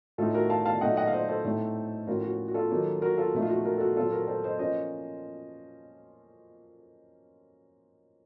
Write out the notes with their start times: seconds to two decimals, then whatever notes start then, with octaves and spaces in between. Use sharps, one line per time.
0.18 A2 A3 D#4 F4 A4
0.34 F#4 A#4
0.50 F5 A5
0.66 F5 A5
0.81 A#2 F#3 A3 D#4 D#5 F#5
0.97 D#5 F#5
1.07 F5
1.13 C5 D#5
1.28 A4 C5
1.45 A2 A3 C4 D#4
2.07 A2 F3 A#3 C#4 F4 F#4 A#4
2.23 F#4
2.48 F#4
2.54 F4 A4
2.70 D#3 F#3 A#3 D#4
3.02 F#4 A#4
3.17 F4 A4
3.34 A#2 F3 A3 D#4
3.42 F4
3.50 F#4
3.65 F#4 A#4
3.77 A4
3.80 F#4
3.96 A#2 F#3 C4 F4 A4
4.12 F#4 A#4
4.28 A4 C5
4.44 C5 D#5
4.59 F3 A#3 C#4 F4 C5 D#5